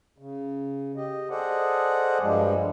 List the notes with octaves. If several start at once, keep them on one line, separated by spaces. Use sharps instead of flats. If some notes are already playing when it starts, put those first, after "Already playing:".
C#3
G4 D#5
G#4 A4 C5 D5 D#5 F#5
G2 F3 G3 G#3